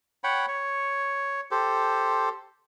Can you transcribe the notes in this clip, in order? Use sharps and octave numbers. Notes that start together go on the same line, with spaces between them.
C#5 F#5 G5 B5
C#5
G4 A4 C5